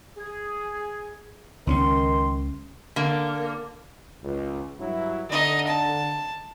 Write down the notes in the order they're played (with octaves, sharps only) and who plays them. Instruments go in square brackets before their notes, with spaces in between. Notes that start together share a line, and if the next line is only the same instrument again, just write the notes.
[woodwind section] G#4
[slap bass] C#2 C4 C#4 [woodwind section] D#3 C6
[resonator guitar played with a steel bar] D3 A#3
[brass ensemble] C#2
G2 F#3 E4
[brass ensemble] D3 [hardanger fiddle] D#4 D#5
[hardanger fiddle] A5